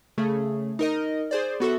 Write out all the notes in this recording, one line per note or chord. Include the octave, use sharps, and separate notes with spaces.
C#3 A3 G#4
D#4 A#4 D#5
G#4 C5 D5
B3 F#4 A4 E5